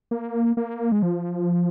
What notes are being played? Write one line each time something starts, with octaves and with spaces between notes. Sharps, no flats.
A#3
A#3
G#3
F3